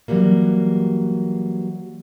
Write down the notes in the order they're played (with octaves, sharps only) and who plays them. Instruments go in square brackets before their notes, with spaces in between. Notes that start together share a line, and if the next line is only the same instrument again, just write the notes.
[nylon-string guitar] E3 F#3 G3 A#3